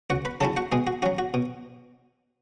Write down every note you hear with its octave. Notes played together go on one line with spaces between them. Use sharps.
C#2 F#4 F#5
B4 B5
C#3 F#3 C#4 E4 A4 A5
F#4 F#5
B2 G#3 G#4
F#4
F#3 C#4 F#4
F#4
B2